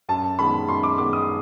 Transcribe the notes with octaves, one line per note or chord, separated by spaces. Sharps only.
F#2 A5
D#3 G#3 B3 B5
F#2 C6
D6
D#3 G#3 B3 D6
D#6